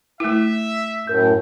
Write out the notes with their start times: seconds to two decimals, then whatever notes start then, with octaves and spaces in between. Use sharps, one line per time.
0.20 A3 E4 E5
1.07 F#2 A2 A#4 G6